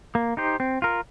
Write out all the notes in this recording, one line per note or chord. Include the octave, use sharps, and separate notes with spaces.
A#3
D#4 G4 C5
C4
F4 A#4